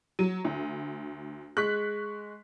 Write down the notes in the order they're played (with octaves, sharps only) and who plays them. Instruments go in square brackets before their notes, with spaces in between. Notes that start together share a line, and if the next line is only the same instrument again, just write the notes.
[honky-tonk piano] F#3 [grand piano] D#7
[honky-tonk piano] D2
[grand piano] G#3 C#6 B6 [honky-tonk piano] F#6